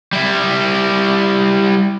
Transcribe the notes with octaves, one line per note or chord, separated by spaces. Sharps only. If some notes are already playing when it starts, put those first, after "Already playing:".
G3 E4